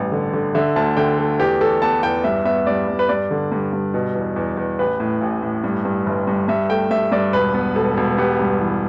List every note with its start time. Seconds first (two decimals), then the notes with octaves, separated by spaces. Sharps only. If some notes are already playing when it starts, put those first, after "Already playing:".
Already playing: A1 G2
0.12 D3
0.34 D3
0.55 D3 E5
0.76 D2 A5
0.97 D3 G5
1.18 A3
1.39 E2 G4
1.61 E2 A4
1.82 B3 A5
2.03 E2 G5
2.24 G2 E5
2.45 B3 E5
2.67 G2 D5
2.88 G2
2.99 B4
3.09 G2 D5
3.31 D3
3.52 G2
3.73 G2
3.94 B2
4.15 E2
4.36 E2
4.57 E2
4.79 A1 B4
5.00 A2
5.22 A1
5.42 A2
5.64 G2
5.85 G2
6.06 G1
6.27 G2
6.48 G2 E5
6.70 A3 G5
6.91 G2 E5
7.12 G2 D5
7.33 E1 B4
7.54 B3
7.76 E1 A4
7.97 E1
8.18 B3 G4
8.39 G2
8.60 E3